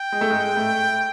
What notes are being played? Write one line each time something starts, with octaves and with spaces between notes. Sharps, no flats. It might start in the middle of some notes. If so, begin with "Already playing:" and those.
Already playing: G5
G#3
A3
G#2 G#3
A2 A3